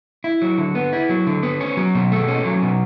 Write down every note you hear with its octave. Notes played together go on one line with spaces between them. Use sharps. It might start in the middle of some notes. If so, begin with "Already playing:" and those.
E4
F#3
D3
B3
E4
F#3
D3
B3
C#4
F#3
B2
A3
C#4
F#3
B2